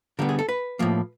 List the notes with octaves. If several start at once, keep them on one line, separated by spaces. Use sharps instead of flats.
D3 G3 B3 A#4
G#4
A4
B4
A2 F3 A#3